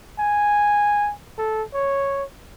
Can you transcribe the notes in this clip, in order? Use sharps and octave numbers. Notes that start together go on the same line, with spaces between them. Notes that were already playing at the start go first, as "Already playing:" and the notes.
G#5
A4
C#5